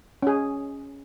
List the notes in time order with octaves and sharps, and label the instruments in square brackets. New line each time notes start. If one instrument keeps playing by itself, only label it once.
[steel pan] C#4 G#4